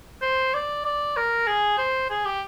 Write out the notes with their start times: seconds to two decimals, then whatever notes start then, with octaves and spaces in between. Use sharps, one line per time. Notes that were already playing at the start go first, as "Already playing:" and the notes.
0.21 C5
0.54 D5
0.85 D5
1.16 A#4
1.47 G#4
1.78 C5
2.10 G#4
2.25 G4